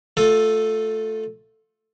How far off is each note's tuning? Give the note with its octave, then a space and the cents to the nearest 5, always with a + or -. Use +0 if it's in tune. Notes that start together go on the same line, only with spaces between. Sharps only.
A3 +0 F4 +25 A4 +0